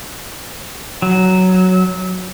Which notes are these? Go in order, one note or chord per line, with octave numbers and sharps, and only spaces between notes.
F#3